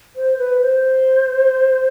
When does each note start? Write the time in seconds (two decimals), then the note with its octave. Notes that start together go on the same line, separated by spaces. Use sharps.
0.16 C5
0.38 B4
0.62 C5